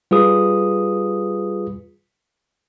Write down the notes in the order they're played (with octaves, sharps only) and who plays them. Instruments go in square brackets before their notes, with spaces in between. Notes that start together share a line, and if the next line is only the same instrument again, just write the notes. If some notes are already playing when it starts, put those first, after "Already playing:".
[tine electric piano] G3 F4 G#4 B4 D#6